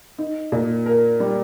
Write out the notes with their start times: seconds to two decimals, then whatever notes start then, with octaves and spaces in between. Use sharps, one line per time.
0.19 D#4
0.52 A#2
0.86 A#4
1.20 G3